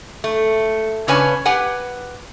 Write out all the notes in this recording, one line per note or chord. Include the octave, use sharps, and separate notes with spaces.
A3
C#3 C#4 D4 B4 C#5 G#5
G4 B4 F#5 G#5